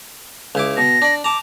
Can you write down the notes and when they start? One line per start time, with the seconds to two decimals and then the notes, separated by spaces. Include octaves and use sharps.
0.55 C#2 E4 D6
0.77 B2 A#6
1.02 D4 D5
1.24 A5 A#5 D6